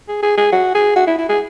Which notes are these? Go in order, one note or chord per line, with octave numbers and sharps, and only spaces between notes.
G#4
G#4
G#4
F#4
G#4
F#4
E4
E4
G#4